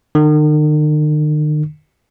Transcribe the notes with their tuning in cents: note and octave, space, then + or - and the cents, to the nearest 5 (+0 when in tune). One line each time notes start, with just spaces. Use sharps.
D#3 -45